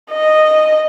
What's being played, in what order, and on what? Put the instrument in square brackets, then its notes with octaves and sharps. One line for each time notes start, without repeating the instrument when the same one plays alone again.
[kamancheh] D#5